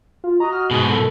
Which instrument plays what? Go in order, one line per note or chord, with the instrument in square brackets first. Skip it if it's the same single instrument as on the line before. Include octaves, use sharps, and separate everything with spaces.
[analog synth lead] F4
[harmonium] F#4 D#5 [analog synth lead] A#5
[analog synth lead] F6
[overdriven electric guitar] G#2 B2 [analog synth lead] G#3
[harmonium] D#3 A4